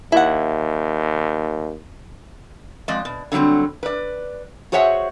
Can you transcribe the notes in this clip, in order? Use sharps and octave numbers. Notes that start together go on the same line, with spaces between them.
D#2 E4 F#5
F2 G#3 D5 D#5
B2
D3 E3 F#3 G3 C4
B4 D5
F#4 G#4 C5 C#5 E5 F#5